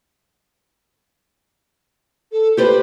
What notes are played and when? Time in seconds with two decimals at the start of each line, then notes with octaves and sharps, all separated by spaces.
2.32 A4
2.57 G4 B4 C5 D5